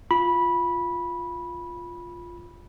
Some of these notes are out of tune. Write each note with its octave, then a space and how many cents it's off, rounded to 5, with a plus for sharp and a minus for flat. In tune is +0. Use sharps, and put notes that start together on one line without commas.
F4 +0 B5 -15